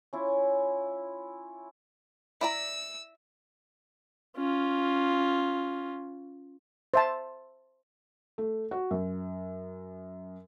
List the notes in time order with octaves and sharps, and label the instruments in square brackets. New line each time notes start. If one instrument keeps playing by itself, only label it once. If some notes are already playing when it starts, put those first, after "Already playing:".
[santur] C#4 E4 F4
[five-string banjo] E4 D5 A#5 [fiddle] E6
[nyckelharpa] C#4 F4
[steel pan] C5 E5 A5
[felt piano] A3
F#4
F#2